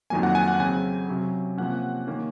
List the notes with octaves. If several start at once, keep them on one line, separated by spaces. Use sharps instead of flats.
F2 D#3 F#3 A#3 G#5
F#5
G#5
F#5
C#3 F#3 C4 G#5
C3 F#3 C#4
C3 F3 A#3 C#4 F#5
D#3 A#3 C#4